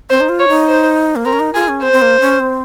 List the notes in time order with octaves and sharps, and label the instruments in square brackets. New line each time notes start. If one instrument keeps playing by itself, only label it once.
[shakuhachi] C4 [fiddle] C5
[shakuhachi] D#4
F4
[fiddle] C#5
[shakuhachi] D#4
[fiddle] C5
[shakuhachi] A#3
[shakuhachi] C4 [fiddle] A#4
[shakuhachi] C#4
D#4
[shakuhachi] F4 [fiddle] G#4
[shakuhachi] C#4
[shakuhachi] C4 [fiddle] C5
[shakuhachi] C4
A#3
C#4
C4